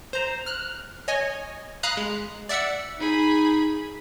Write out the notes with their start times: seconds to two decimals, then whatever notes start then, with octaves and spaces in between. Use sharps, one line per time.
0.13 C5 A#5
0.46 F6 F#6
1.08 C#5 D#5 G#5
1.83 F5 A#5 B5 D#6 F#6
1.97 G#3
2.49 D5 E5 F#5 E6 C#7
3.00 D#4 G#4 B5